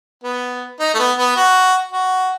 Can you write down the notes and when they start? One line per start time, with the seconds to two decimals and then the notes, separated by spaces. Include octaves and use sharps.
0.24 B3
0.79 D#4
0.94 A3
0.99 B3
1.18 B3
1.35 F#4
1.92 F#4